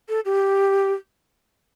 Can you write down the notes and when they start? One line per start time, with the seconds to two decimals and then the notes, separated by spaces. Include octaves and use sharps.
0.09 A4
0.25 G4